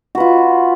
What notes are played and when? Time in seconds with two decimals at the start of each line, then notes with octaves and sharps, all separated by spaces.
0.15 F#4
0.17 B4
0.20 F4